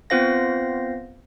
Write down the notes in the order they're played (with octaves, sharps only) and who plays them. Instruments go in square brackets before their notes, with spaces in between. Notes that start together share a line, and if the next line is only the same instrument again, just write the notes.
[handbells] B3 C4 F4 C5 F5 A#6